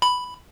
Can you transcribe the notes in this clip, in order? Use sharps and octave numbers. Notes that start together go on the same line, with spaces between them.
B5